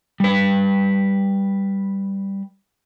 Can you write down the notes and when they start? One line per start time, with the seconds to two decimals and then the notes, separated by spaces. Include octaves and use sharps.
0.20 G3 B4